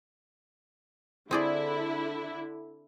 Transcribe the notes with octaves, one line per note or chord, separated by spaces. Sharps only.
D3 C4 E4 G#4 D5